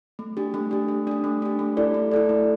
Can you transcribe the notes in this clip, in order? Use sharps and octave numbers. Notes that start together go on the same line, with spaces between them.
A3
D4 G4
A3
D4 G4
A3
D4 G4
A3
D4 G4
A3
E4 A4 D5
A3
E4 A4 D5
A3